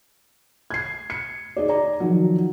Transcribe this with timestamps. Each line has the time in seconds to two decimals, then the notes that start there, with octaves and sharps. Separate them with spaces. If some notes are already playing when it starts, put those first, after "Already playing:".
0.70 G#6 C7
1.10 C#7
1.57 D#4 G#4 D5
1.69 D5 A#5
2.00 D#3 F3 F#3